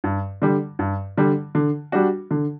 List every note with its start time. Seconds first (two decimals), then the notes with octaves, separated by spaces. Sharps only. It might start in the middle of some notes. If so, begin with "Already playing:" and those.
0.04 G2
0.42 D3 G3
0.79 G2
1.18 D3 G3
1.55 D3
1.92 G3 D4 F#4
2.31 D3